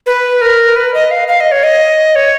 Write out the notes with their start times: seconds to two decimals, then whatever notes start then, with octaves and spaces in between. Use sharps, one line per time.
0.06 B4
0.41 A#4
0.76 B4
0.94 D#5
1.11 F5
1.28 F5
1.40 D#5
1.52 C#5
1.63 D#5
2.16 C#5